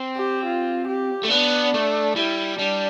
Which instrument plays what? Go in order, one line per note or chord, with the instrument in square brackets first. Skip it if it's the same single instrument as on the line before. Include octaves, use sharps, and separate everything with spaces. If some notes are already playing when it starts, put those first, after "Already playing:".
Already playing: [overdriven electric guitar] C4
[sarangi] G4
F4
G4
[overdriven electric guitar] A3
[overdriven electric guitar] B3 [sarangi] D4
[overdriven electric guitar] A3
[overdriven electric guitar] G3 [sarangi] E4
[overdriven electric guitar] G3 [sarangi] D4